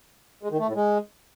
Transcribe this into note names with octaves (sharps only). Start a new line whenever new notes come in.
G#3
D#3
A3
A2
G#3